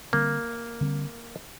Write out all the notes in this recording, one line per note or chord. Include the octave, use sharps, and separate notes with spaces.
D3 G3 A#3 C4
D3 G3 C4